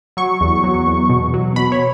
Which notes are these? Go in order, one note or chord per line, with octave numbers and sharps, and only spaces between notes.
F#3 C#6
E2
F#3
E2
B2
F#3
B2 B5
C#5